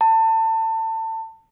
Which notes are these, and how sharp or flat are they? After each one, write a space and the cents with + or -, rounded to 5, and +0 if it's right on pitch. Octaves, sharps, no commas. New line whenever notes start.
A5 +30